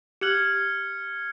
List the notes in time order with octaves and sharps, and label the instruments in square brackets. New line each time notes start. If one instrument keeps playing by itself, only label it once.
[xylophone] G4 F#6 F#7 [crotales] F6 G#6 C#7